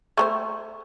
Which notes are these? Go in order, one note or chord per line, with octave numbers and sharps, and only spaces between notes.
A3 A4 C5